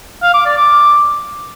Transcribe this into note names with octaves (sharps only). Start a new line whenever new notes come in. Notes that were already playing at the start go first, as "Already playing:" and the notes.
F5
D6
D5
D6